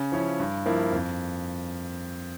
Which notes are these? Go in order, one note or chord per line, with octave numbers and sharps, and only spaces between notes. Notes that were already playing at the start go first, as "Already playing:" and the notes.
Already playing: C#3
F3 C#4 E4
G2
F3 A#3 E4
F2